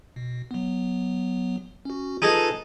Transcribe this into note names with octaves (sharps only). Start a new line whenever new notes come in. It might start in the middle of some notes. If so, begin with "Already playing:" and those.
B2
F#3 B3
C#4 F#4
D#4 F4 G#4 A4 B4